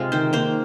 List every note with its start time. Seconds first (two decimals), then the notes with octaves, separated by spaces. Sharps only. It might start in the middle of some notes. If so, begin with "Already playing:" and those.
Already playing: C3 G#3 F4
0.12 D#3 C5
0.33 A#3 C5